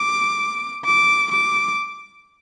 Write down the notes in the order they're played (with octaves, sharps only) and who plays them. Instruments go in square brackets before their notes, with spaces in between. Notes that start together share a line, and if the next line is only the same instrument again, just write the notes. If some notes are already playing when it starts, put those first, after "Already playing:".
Already playing: [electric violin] D6
D6
D6